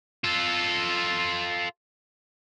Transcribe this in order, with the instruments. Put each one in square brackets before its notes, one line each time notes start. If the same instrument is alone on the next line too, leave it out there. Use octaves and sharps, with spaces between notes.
[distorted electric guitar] F4 A4